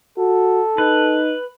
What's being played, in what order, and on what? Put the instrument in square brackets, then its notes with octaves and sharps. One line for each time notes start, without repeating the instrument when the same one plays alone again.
[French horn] F#4 [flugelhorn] A4
[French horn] D#4 [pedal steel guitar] B4